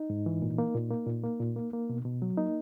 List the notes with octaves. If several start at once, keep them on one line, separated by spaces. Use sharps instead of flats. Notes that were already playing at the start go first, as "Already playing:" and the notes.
Already playing: D#4
G#2
E3
A#2
A#3
A#2
A#3
A#2
A#3
A#2
A#3
A#3
B2
B2
F#3
A#3 D#4